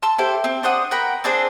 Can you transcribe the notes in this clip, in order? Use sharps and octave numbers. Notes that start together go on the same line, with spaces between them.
A5 C6 E6
E4 G4 A4 C5
C4
D4 C5 F#5 D#6
A#4 F#5 G5 B5
C4 D4 G#4 C5